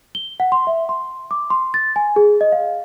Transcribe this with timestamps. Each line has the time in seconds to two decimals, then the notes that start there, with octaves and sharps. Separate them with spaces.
0.15 G7
0.40 F#5
0.52 C6
0.67 E5
0.89 C6
1.31 D6
1.50 C6
1.74 A6
1.96 G#5
2.16 G#4
2.41 D#5
2.52 F5